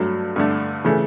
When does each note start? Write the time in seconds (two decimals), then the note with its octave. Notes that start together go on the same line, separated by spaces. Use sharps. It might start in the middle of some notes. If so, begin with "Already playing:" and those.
Already playing: G2 F#3 A3
0.36 G2 D3 A3
0.84 C#3 E3 A3